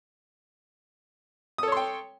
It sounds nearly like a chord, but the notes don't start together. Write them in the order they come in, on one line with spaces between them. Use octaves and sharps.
D#6 A4 C#5 C6 G5